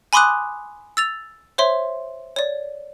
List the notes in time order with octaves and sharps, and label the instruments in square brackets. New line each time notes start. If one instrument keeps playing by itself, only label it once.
[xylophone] G#5 B5 C6 D6 D#6 F#6
E6 A6 F7
C5 C#5 E5 C6
C#5 D5